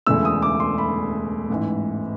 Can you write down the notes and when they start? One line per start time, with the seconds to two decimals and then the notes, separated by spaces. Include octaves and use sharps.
0.07 E1 D2 C#3 E3 A3 E6
0.25 D#6
0.42 D6
0.60 C6
0.78 B5
1.50 A1 G#2 E3